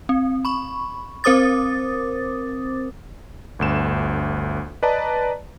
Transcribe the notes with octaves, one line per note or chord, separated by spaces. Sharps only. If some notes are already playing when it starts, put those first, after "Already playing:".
C4
B5 C#6
C4 A#4 C5 D6 D#6 A6
G1 D2 E7
B4 D5 D#5 A5 A#5